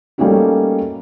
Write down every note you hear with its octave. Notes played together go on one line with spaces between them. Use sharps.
G3 A3 A#3 C#4 D#4 F#4